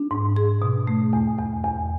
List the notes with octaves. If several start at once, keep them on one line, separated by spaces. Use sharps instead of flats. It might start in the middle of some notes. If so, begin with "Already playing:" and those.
Already playing: D4
G#2
G#4
B2
A3
E2
E2
E2